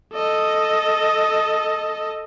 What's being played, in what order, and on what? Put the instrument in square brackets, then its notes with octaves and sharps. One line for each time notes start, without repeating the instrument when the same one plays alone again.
[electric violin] A4 D#5